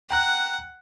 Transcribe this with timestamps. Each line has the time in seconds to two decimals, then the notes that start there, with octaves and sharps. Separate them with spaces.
0.11 F#5 G5 A#5 F#6